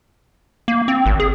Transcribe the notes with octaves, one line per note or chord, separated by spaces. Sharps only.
A#3
C4
G#1
G#4